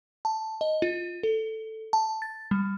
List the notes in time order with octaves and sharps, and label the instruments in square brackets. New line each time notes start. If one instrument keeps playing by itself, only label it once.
[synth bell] A5
D#5
F4
A4
A5
A6
G3